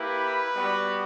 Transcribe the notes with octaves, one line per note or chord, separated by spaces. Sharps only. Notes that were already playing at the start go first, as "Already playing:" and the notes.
Already playing: A#3 E4 G4 B4
G3 B3 F#4